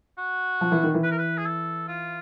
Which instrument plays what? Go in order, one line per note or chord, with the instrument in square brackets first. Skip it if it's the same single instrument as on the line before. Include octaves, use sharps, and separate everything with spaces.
[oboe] F#4
[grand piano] F3
E3
D#3
E3
[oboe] B4
A#4
B4
G#4
A4
F4